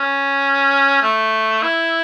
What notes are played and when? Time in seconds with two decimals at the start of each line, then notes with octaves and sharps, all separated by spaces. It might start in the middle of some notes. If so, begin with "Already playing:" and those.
Already playing: C#4
1.03 A3
1.63 E4